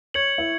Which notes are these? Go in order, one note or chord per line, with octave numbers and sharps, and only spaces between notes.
C#5 G#6 C#7 F#7
E4